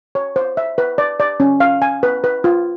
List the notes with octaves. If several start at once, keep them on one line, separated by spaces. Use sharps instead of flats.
C#5
C5
E5
B4
D5
D5
C#4
F5
G#5
B4
B4
F4